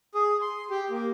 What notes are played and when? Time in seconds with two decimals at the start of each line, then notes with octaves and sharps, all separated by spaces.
0.15 G#4
0.41 C6
0.70 G4
0.90 A#3